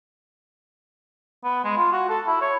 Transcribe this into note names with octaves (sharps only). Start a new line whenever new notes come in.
B3
G#3
F4
F#4
A4
E4
C#5